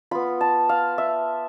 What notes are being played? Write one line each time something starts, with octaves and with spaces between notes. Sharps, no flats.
B3 F4 B5
A5
F5
E5